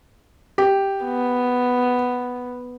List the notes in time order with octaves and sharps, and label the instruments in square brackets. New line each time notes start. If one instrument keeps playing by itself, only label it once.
[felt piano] G4
[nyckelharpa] B3